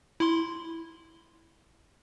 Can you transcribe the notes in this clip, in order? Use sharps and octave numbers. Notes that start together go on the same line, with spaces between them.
E4 C6